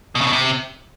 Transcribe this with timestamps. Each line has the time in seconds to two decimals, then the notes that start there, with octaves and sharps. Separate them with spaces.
0.15 B2
0.21 C#3
0.27 B2
0.33 C3